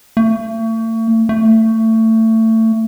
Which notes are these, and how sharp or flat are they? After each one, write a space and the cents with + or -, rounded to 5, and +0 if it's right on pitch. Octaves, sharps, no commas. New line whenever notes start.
A3 +40
A3 +25